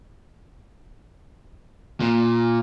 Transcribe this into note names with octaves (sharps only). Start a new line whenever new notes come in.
A#2